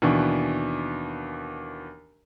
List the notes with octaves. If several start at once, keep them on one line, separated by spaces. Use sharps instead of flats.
D#2 B2 E3 D4